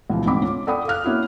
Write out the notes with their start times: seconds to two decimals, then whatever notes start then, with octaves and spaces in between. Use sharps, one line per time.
0.10 C#2 B2 E3 F3
0.25 D2 G#2 C4 D#4 B5 D6
0.42 C#4 F4
0.67 A4 D5 F#5 G5 B5 D#6
0.88 F5 F6 F#6
1.05 A#3 C#4 E4 F#4